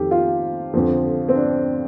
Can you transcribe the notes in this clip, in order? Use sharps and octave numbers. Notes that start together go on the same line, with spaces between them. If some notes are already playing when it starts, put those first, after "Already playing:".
Already playing: F2 D#3 G4 A4
F4
F2 D3 F3
C4
D4